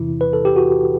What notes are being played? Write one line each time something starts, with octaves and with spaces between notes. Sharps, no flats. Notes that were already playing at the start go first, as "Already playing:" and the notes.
Already playing: E2 C3 E3 E4
B4
A4
G4
F#4